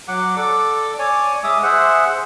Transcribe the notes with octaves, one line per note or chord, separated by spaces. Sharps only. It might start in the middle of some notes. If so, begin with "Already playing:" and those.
F#3 F#5 D6
A4 D5 D6
C#5 D5 G#5
G#3 E5 D6 D#6
G#4 C5 E5 F#5